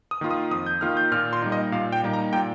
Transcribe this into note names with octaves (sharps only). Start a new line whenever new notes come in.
D#6
D#3 A#3 F4
D#6
F2 D#6
G6
D#3 A#3 F4 F6
G6
A#2 F6
C6
G3 A#3 D#4
D#5
A#2 F5
G5
G3 A#3 D#4
A#5
A#2 G5